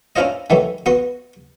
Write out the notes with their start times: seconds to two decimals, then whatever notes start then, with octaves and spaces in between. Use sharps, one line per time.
0.16 C#4 D4 E4 F4 C5 D#5
0.50 D#3 E3 F#3 A3
0.86 B3 F#4 C6